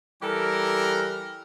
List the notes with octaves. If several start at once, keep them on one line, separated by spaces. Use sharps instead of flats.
E3 G3 G4 A4 A#4